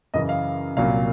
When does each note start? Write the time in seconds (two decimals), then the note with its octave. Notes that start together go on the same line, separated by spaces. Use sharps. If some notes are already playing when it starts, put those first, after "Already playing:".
0.14 F#2 C#3 E3 D#5
0.29 F5
0.77 C2 A#2 F#3 F5